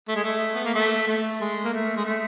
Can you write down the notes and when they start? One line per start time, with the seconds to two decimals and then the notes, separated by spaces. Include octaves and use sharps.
0.08 A3
0.16 G#3
0.24 A3
0.54 B3
0.65 A#3
0.74 A3
1.07 A3
1.40 G#3
1.64 A#3
1.73 A3
1.96 G#3
2.05 A3